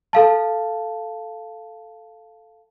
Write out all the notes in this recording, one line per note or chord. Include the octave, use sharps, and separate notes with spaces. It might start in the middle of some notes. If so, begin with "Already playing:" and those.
A4 F5 A5